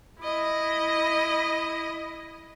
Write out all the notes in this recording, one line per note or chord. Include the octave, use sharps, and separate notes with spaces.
E4 D#5